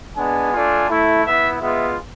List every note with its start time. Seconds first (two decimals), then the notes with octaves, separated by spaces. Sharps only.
0.17 G#3 B3 D4 G#5
0.52 A3 D4 F4
0.89 A3 E4
1.25 B3 E4 E5
1.60 G#3 B3 F4 E5